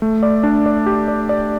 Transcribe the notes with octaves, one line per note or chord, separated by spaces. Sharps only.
A3
D5
D4
D5
G4
D5
D5